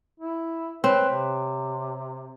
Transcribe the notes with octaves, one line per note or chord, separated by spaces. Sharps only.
E4
C4 B4 C#5
C3